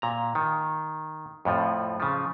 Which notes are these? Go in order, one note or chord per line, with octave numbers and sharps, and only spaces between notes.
A#2 A#5
D#3
F2 A2 F3
C#3 F3